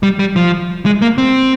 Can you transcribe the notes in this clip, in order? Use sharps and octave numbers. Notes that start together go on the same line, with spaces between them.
G3
G3
F3
G#3
A#3
C4